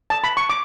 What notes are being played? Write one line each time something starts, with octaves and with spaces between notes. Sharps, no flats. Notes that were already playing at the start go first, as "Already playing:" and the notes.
A5
B5
C#6
D6